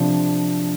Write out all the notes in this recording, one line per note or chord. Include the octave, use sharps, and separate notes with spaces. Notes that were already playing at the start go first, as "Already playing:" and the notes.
Already playing: C3 F3 D4